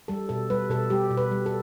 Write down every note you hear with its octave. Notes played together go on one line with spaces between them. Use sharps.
G3 A4
B2 A4
G3 B4
B2 A4
G3 G4
B2
B4
G3
A4